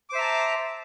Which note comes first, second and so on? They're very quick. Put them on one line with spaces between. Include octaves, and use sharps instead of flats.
D6 C5 E5 A#5 A5